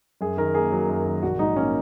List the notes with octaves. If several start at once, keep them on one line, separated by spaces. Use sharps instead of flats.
F#2 G#4
D#3 A#4
A#3 G#4
F#3
F#2
D#3
A#1 F#4
G#2 D#4
A#3 C#4